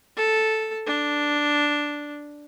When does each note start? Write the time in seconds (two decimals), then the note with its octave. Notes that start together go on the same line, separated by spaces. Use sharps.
0.16 A4
0.86 D4